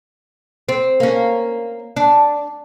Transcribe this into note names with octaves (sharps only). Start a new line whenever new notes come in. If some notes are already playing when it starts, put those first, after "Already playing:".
C4
A#3 C#4
D4